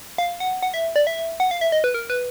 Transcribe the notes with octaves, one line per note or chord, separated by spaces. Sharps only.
F5
F#5
F#5
E5
D5
E5
F#5
F5
E5
D#5
B4
A#4
B4